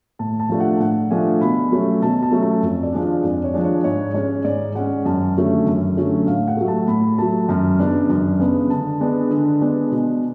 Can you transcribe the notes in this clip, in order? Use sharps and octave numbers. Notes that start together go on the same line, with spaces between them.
A2 A5
A5
F3 A3 D4
F#5
A2 F#5
F3 A3 D4 G#5
B2 B5
F#3 A3 C#4
B2 A5
A5
F#3 A3 C#4
A5
F2
D5
F3 G#3 D4
F5
F2 D5
C#5
F3 G#3 D4
C#5
G#2 C#5
G#3 C#4 C#5
G#2 D5
G#3 C#4 F#5
F#2 A5
D3 F#3 A3 C#4
F#2
D3 F#3 A3 C#4
A2 F5
F#5
F#3 A3
A5
A2 B5
F#3 A3 A5
F#2
C#3 G#3 B3 D4
F#2
C#3 G#3 B3 D4
D3 A5
G#3 B3 D4
D3
G#3 B3 D4
B2